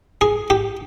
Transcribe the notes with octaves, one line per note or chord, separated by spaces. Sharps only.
G#4
G4